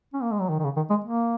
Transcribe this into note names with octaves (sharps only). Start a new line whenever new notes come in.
C#4
A#3
G#3
F#3
D#3
D#3
C#3
D#3
G#3
A#3